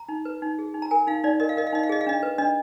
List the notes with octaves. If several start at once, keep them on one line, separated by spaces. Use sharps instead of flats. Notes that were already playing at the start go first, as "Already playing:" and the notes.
Already playing: A#5
D#4
B4
D#4
G#4
D#4
A#5
A#4 G#5
D#4 F5
D#4 D5
A#4 D#5
F5
A#4 D#5
F5
D#4 D#5
F5
G#4 D#5
F5
D4 D#5
B4
D4 D#5